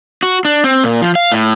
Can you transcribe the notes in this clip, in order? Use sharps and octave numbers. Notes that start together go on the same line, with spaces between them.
F#4
D4
C4
A#2
F3
F5
A2